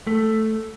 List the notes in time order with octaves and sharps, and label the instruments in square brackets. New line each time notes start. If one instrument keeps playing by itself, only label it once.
[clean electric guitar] A3